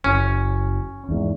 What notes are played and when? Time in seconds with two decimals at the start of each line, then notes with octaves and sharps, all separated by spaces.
0.04 F#1 C#4
1.09 E2 G#2